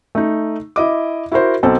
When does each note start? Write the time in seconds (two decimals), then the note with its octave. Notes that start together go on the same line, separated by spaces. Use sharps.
0.15 A3 D#4
0.76 E4 D#5 D6
1.32 E4 F#4 A#4 C5
1.63 B1 C4 A4